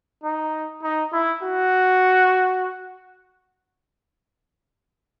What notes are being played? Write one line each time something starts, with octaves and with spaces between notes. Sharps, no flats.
D#4
D#4
E4
F#4